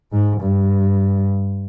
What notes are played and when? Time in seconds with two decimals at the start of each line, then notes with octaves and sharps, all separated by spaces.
0.12 G#2
0.41 G2